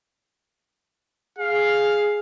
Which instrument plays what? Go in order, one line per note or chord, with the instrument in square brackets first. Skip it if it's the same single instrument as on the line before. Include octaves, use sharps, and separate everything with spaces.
[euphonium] G#4 [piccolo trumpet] F5